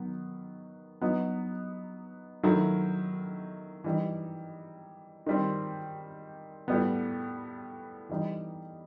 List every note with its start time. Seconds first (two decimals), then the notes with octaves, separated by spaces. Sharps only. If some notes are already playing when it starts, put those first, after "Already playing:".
Already playing: D#3 F#3 B3
1.01 F#3 B3 D#4
2.43 D#3 F#3 A3 E4
3.84 E3 G3 D#4
5.26 D#3 G3 C4
6.68 A2 G3 B3
8.09 E3 G3 D#4